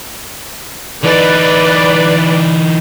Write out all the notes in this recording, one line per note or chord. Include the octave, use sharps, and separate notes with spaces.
E3 D#4 B4 D5